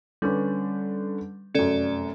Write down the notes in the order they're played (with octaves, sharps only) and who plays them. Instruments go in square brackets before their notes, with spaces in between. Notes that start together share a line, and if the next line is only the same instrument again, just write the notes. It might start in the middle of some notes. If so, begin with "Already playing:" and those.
[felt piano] D3 C#4 B4 [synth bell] G3
[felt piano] F1 F#2 [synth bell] C#4 A4 D5